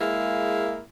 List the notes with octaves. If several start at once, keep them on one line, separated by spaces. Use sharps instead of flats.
G#3 A#3 E4 G#4 F5